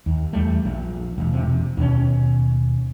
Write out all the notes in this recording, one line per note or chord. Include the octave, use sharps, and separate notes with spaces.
D#2
E2 G3 A3
A#1
E1
E1 C3
D#2 B2 A#3 C#4